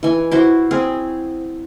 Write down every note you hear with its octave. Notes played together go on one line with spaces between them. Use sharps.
E3 G#5
E4 F#4 C5
C4 G#4